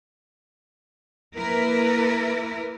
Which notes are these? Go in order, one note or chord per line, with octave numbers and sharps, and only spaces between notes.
A#3 E4 A#4 B4